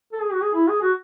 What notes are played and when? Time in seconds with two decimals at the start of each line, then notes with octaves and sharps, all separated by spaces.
0.12 A4
0.22 G#4
0.32 F#4
0.43 G#4
0.54 E4
0.68 G#4
0.82 F#4